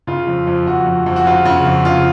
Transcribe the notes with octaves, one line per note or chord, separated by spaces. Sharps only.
C#3 F4
F2
F2
F2 F#4
F2
F2
F#4
C#3 F4
C#3
F2
C#3 F4